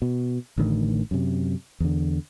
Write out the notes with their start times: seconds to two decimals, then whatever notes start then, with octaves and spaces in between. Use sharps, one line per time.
0.02 B2
0.58 A1 A2 D3 D#3
1.11 F#2 C3
1.80 E2 D3